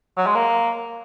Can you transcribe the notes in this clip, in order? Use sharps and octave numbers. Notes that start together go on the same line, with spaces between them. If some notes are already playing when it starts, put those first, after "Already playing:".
F#3
G#3
A#3